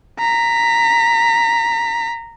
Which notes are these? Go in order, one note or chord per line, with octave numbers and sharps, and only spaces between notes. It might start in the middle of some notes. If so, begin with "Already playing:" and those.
A#5 B6